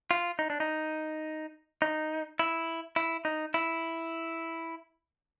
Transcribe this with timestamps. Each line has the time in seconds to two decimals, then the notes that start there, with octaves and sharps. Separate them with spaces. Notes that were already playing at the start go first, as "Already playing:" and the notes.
0.11 F4
0.39 D#4
0.50 D4
0.60 D#4
1.82 D#4
2.39 E4
2.96 E4
3.25 D#4
3.54 E4